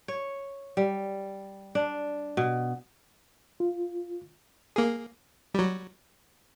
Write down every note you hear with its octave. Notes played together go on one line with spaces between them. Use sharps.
C#5
G3
D4
B2
F4
A#3 G#4
F#3 G3